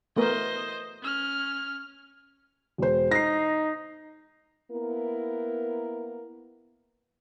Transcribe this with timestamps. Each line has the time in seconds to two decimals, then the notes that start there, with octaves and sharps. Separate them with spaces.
0.17 A3 B3 A#4 C5 D#5
1.02 C#4 F6
2.78 E1 C5
3.11 D#4 A#6 C7
4.71 A#3 B3 E4 A#4